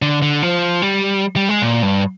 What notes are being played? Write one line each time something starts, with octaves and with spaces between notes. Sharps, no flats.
D3
D3
F3
G3
G3
G#3
A#2
G2